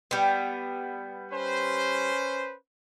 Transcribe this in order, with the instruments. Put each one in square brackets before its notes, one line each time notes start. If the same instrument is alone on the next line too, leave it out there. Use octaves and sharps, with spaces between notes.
[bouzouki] G3 B3
[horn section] C#4 B4 C5